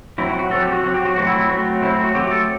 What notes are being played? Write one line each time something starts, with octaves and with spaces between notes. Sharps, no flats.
F#3 C4 E4
F#4
F#4
F#3 C4 A4
G4
F#4
F#3 C4 F#4
G4
F#4
F#3 A3 C4 F#4
E4
E4
F#3 A3 C4 F#4
F#3 A3 C4 E4
F#4
F#3 A3 C4 G4
A4